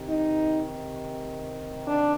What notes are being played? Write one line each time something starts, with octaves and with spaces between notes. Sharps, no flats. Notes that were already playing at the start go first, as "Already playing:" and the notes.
Already playing: C3 D#3
D#4
D4